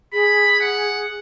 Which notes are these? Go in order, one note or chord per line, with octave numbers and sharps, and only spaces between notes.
G#4 B5
F#5